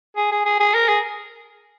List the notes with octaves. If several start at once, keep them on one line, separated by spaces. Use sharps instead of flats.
G#4
G#4
G#4
G#4
A#4
G#4